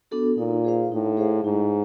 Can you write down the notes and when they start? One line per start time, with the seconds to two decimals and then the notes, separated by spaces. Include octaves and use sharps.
0.11 B3 D4 F#4 A4
0.38 A#2 D#4
0.64 G#4 C5 F5
0.92 A2 D#4
1.17 G#4 C5 F5
1.44 G#2 E4